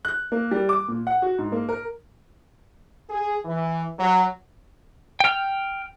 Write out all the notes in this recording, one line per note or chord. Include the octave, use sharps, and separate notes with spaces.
F#6
A#3
G3
D6
A#2
F#5
F#4
G#2
A#3
A#4
G#4
E3
F#3
G5 F6